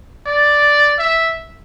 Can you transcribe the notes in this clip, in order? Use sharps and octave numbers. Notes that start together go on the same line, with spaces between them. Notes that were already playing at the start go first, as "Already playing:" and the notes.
D5
E5